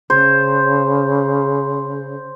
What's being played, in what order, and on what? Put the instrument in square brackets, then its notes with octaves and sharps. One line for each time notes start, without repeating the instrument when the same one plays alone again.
[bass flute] C#3 [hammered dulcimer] C5